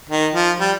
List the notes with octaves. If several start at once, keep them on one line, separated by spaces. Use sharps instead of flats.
D#3
F3
G3